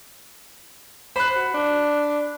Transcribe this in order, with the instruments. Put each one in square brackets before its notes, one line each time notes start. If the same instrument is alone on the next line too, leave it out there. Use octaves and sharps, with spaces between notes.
[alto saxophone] C5 [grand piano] B5 F#6
[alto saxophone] F#4
D4